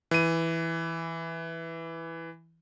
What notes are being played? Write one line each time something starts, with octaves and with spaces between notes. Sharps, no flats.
E3 D#7